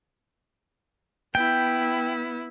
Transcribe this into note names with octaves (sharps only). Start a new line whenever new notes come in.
B3 E4 G5